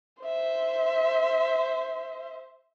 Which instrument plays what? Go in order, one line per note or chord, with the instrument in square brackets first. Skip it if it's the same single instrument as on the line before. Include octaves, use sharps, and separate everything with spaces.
[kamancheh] C5 E5